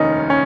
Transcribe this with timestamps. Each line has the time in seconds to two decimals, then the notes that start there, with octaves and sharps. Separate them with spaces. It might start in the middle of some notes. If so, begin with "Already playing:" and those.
Already playing: F1 D#2 D#3 C#4 D#4
0.30 C#4